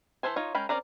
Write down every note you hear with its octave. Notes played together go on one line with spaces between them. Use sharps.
E3 F3 A4 C5 G#5
D#4 F4 C#5
G#3 C#4 A#4 G5 B5
C4 C#4 A#4 D5 A#5